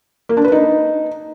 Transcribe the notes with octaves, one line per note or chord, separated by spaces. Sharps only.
A#3
D4
B4
D#4